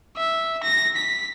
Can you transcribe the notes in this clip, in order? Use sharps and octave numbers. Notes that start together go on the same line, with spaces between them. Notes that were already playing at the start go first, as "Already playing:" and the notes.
E5
A#6
B6